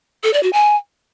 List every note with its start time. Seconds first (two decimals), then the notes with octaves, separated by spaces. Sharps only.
0.24 A4
0.33 D5
0.43 F#4
0.53 G#5